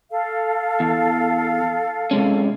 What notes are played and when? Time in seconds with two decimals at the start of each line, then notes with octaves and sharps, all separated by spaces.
0.11 A4 F5
0.80 E2
2.11 C3 G#3 C#4